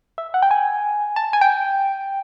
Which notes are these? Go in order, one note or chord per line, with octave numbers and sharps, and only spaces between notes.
E5
F#5
G5
G#5
A5
G#5
G5